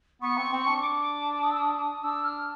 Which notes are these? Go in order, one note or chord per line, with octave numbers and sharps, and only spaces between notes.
B3 C#6
C4
C4
D4
D6
D#6
E6
D#6
D4 E6
F6